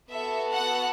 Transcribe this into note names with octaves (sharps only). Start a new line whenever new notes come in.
B3 F#4 A4 E5
F#5